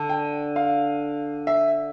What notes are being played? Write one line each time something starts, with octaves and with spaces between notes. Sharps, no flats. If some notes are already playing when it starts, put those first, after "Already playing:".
Already playing: D3
G5
F5
E5